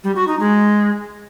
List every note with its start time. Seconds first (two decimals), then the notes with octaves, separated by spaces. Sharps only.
0.04 G3
0.16 F#4
0.28 D#4
0.40 G#3